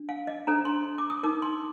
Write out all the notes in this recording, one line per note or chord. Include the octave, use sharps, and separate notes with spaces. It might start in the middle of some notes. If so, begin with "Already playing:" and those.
Already playing: D4
F5
D#5
D4 A4 C5 A#5
C6
D6
D#6
D#4 A#4 D6
C6